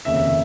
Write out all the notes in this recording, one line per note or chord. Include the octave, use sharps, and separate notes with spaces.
F1 D#2 C#3 E5
E5
E5